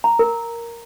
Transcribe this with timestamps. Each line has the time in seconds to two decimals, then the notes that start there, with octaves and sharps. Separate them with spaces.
0.04 A#5
0.19 A#4